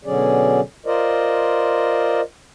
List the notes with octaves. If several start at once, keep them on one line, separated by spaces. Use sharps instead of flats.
B2 D3 F#3 C#4 G#4 D5
F4 A#4 C5 D5 D#5